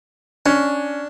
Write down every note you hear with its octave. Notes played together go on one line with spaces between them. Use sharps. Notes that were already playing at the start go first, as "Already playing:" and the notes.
C#4 D4